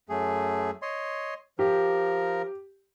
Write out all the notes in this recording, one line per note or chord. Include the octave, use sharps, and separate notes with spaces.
F#2 A3 G#4
C#5 D#5 C6
F3 G4 A#4